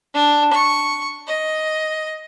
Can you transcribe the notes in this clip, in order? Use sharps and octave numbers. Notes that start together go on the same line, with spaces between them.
D4
C#6
D#5